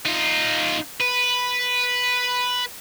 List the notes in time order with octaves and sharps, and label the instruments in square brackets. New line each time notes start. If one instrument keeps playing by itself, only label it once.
[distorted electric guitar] D#4 F4
B4